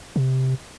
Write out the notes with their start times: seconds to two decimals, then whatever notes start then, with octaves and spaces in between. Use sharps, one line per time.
0.16 C3